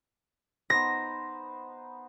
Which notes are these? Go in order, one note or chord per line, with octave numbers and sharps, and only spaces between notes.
B3 D#4 C5 A#6